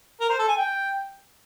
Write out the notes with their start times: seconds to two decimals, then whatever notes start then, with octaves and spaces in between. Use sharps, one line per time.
0.20 A#4
0.30 C5
0.39 A4
0.48 G#5
0.58 G5